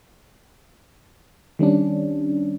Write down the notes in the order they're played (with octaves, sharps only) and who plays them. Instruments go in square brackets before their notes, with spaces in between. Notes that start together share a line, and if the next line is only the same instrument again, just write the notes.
[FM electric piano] D#3 G3 C#4 D4